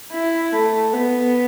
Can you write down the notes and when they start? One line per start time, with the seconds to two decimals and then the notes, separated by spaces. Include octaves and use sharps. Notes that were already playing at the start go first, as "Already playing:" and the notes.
0.12 E4
0.52 A3
0.93 B3